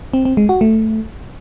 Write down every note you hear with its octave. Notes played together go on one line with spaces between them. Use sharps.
C4
C4
G#3
F#4
A3